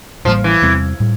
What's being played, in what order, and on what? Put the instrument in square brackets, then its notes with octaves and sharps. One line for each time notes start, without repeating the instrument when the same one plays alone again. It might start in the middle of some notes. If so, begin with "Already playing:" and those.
[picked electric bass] A1 A2 G3 A#3 [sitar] F3
[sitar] E3
[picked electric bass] E2 C3 G3 C4
A2 G3